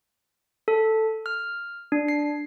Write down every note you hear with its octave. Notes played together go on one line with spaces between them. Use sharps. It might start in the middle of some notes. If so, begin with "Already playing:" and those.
A4
F6
D4
C7